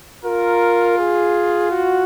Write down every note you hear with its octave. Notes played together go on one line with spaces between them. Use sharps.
F4 A#4
G#4
F#4